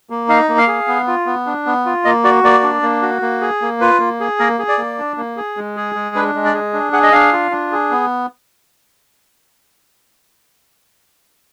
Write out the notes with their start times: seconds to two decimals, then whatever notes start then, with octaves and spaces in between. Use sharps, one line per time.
0.10 A#3
0.28 D#4 F5
0.49 A#3
0.58 F5
0.68 G#4
0.88 B3
1.07 F4
1.26 B3
1.46 D4
1.66 B3
1.85 F4
2.05 A#3 D#5
2.24 F#4 D5
2.44 A#3 D5
2.63 D4
2.82 A#3
3.02 F#4
3.22 A#3
3.41 G#4
3.62 A#3
3.81 F4 B4
4.00 A#3
4.20 G#4
4.39 A#3 A#4
4.59 G#4
4.69 D5
4.78 A#3
4.98 D4
5.17 A#3
5.37 G#4
5.57 G#3
5.76 G#4
5.95 G#3
6.15 D4 B4
6.35 G#3
6.45 D5
6.54 G#4
6.73 D4
6.93 G#4 F#5
7.03 D#5
7.12 D4 F5
7.33 F4
7.51 D4
7.72 G#4
7.91 B3